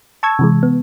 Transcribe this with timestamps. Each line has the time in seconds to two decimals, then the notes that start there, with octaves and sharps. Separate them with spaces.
0.23 A5 C#6 E6 G#6
0.39 C3 E3 G#3
0.63 B3